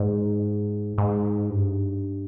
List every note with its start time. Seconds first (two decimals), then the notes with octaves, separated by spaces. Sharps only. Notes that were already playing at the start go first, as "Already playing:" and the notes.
Already playing: G#2
0.98 G#2
1.49 G2